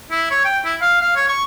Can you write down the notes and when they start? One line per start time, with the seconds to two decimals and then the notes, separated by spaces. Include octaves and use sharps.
0.11 E4
0.31 C#5
0.45 G5
0.65 E4
0.82 F5
1.01 F5
1.16 C#5
1.28 C#6